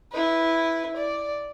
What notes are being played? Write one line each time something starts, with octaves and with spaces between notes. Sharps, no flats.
E4 B4
D5